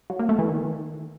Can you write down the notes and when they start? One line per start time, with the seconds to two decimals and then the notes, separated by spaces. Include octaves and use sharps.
0.10 F#3
0.19 A#3
0.29 A3
0.39 E3
0.48 D#3